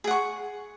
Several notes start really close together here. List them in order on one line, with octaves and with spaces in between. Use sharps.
G#4 F#5 C#6